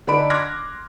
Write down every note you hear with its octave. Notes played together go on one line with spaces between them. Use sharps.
D3 D4 D#4 B5 D7
C6 D6 F6 F#6 G#6 A#6